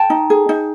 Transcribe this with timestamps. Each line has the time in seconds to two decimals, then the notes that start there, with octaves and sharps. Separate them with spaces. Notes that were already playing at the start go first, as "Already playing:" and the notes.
Already playing: G5 A5
0.10 D#4
0.30 G#4
0.49 D#4